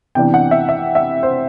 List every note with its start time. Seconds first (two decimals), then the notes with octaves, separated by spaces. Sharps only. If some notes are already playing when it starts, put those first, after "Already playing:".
0.15 C3 E3 B3 D4 G5
0.34 F#5
0.51 E5
0.69 E5
0.95 E5
1.23 C5